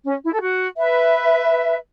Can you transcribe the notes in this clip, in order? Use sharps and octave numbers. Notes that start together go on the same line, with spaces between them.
C#4
E4
A4
F#4
B4 E5